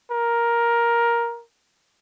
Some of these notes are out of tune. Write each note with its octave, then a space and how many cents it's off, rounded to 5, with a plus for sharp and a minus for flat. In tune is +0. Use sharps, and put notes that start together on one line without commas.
A#4 +10